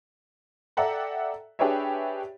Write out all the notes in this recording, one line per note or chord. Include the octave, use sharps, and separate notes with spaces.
A4 D5 E5 F#5 G5 A#5
D4 G4 G#4 B4 C#5 E5